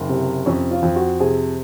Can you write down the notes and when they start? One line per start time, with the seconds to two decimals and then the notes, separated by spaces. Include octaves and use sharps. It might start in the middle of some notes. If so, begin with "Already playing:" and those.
Already playing: F#1
0.09 C3
0.46 F2 C#4
0.71 F4
0.82 F2
0.96 F#4
1.20 C3 G#4